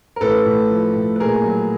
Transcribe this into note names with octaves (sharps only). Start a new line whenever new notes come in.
A#4
A2 A4 B4
A2
F3
A2
B4
A#2 G#4 A#4
F#3